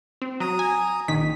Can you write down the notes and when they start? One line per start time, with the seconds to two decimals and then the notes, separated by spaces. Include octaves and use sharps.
0.22 C4
0.40 F#3 A#5 D#6
0.59 G#5
1.08 A#1 D#3 B6